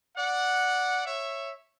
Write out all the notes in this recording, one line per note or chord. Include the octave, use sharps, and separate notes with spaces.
D5 F#5
C#5 E5